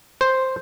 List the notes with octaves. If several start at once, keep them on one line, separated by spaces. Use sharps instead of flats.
C5